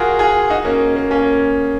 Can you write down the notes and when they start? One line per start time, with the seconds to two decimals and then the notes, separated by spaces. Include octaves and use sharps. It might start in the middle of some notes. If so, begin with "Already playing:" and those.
Already playing: F4 F#4 G#4 A#4
0.19 F4 G#4
0.50 D#4 F#4
0.65 A#3 C#4
0.96 A#3
1.11 A#3 C#4